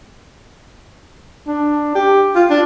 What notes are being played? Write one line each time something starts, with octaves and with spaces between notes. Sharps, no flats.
D4
G4
F4
D4